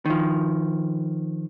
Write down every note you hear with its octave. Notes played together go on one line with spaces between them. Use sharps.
D#3 F3